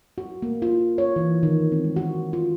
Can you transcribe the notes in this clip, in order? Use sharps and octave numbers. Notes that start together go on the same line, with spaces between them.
F#4
A#3
F4
C#5
E3
D#3
C4
G#3
F#4
F4